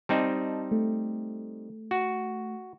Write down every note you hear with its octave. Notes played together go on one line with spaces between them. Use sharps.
G3 C4 D#4 D#5 A5
A3
F#4